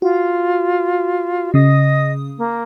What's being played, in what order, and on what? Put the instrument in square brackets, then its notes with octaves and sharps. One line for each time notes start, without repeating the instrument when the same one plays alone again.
[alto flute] F4 [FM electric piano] F#4
[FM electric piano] C#3 D#6 [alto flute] D#5
[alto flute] A#3